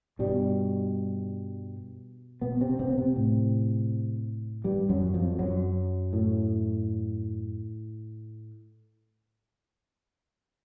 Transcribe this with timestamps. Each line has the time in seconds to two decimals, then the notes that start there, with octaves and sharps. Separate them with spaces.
0.19 G2 B2 G3
2.41 B2 B3
2.60 C3 C4
2.79 C3 C4
2.89 B3
2.98 C3 C4
3.16 A2
4.64 G2 G3
4.89 F#2 F#3
5.14 F2 F3
5.39 F#2 F#3
6.13 A2